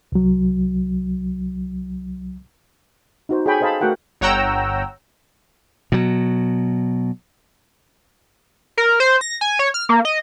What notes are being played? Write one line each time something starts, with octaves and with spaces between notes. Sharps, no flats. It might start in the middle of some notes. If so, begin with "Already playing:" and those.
C2 F#3
D#4 F#4 C5
G#4 A4 C#5 G5 G#5 B5
A4 C5 D#5 F5 A5 B5
A3 F#4 A#4 F#5 G5
G1 C#5 F#5 G5 A#5 E6
B2 F#3
A#4
C5
A#6
G#5
C#5
F6
A#3
D#5